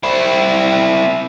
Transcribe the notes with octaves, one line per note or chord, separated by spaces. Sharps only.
C4 E4